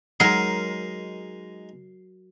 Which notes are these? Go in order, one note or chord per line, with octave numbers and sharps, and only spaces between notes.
F#3 G#3 D#4 A#4 C7